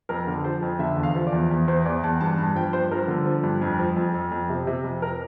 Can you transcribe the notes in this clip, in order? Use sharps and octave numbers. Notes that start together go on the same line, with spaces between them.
F2 A#4
D3
F3 C5
F2
D3 E5
E2
F5
F3
D5
E2
E2
E2 C5
E2 D5
E2 A5
G2 A5
G2 A5
F3 G5
G2 C5
F3 A#4
D3
F3
G2
F2
F3
F2
F2
F2
C3
C3
F2
A#4